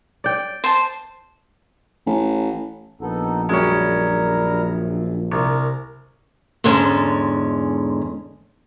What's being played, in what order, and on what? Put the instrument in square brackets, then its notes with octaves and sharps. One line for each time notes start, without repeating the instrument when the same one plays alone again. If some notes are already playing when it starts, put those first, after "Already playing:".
[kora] D5 G5
[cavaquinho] C5 A5
[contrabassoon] A1
[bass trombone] A#1 [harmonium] B3 D#4 A4
[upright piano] F#2 [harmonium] G3 A#4 A#5 [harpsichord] G#3 C#4
[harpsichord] C2 [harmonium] A#4 A#5
[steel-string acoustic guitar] E2 G#2 D3 G#3 C#4 A5